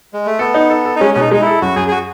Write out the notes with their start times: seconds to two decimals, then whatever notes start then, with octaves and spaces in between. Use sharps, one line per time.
0.13 G#3
0.26 A3
0.39 B3 A4
0.54 D#4
0.70 A4
0.85 A4
0.96 D#4
1.00 G#3 C#4
1.14 B2 C#4
1.21 D#4
1.31 G#3 D#4
1.41 E4 A4
1.61 F#2 F#4
1.76 F#2 G#4
1.88 G#4
1.91 F#4